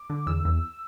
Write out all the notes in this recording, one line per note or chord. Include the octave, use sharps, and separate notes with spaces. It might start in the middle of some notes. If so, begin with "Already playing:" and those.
Already playing: D6
D3
E2 E6
E2